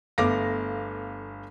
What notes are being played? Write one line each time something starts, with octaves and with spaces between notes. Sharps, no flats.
G1 A3 B3 F5 D6 A#6